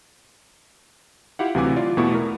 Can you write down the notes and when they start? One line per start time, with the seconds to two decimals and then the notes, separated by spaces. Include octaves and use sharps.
1.39 E4 F4 G4 F5 F#5
1.55 D2 C3 E3 F#3 G#5 D6
1.76 F4 D5
1.97 E2 B2 A3 B3 E4 C#6
2.15 A#4